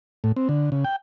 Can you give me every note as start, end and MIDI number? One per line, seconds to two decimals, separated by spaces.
0.24 0.32 45
0.36 0.48 60
0.49 0.70 50
0.72 0.84 49
0.84 0.96 79